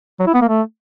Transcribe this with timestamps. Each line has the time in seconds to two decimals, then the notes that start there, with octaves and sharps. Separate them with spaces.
0.20 F#3
0.27 E4
0.34 B3
0.42 A#3
0.49 A3